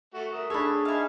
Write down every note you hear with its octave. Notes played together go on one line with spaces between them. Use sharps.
A3 F#4
A#4 E5 D#6
A3 D4 G#4 C#5 A5 B5 E6
D#4 E5 F5 G#5